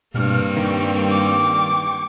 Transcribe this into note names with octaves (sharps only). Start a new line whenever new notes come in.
G2 B2 A#3 C4 F6
D#3 G3 G5 C#6
D6